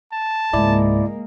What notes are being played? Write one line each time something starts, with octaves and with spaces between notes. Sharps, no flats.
A5
C#2 G#2 G#3 A#3 E4 D5